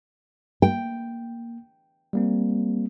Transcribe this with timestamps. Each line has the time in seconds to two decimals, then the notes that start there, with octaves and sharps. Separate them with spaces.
0.62 A#3 G5
2.13 G3 A#3 C4